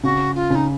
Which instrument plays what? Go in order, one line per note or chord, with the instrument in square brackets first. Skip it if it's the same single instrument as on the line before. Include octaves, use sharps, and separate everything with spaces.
[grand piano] C#3 [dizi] F#4
[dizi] F4
[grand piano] C#3 [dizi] D#4